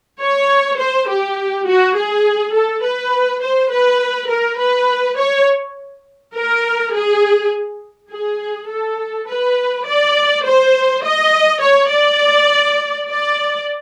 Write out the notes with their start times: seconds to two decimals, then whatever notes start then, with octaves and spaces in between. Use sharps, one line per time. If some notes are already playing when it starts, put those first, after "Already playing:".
0.20 C#5
0.78 C5
1.08 G4
1.67 F#4
1.96 G#4
2.54 A4
2.83 B4
3.42 C5
3.71 B4
4.29 A#4
4.59 B4
5.17 C#5
6.35 A#4
6.94 G#4
8.11 G#4
8.69 A4
9.27 B4
9.86 D5
10.45 C5
11.03 D#5
11.61 C#5
11.90 D5
13.08 D5